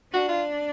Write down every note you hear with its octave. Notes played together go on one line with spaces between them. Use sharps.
D4 F#4
F4